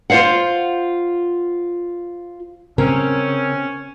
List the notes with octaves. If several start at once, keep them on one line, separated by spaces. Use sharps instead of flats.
F4 C5 C#5 F5 F#5
C#3 C4 C#4 A#4